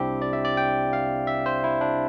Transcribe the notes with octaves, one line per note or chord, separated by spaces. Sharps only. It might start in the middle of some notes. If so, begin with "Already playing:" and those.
Already playing: C2 C3 G3 C4 D4 E4 G4
D5
E5
D5
G5
F5
E5
C5
E4
D4